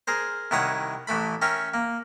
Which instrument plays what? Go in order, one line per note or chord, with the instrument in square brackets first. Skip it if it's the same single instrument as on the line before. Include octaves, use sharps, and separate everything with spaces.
[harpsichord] G#4 A#4 C5
C2 D#3 E4 C#5 F#5 D#6
A1 E3 A3 B5
C#4 A#4 E5 G5 C#6
A#3